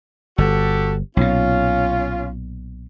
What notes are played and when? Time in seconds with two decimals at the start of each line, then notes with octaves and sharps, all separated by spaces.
0.38 G1 F#4 G4 A4
1.17 B1 A#2 C#4 F4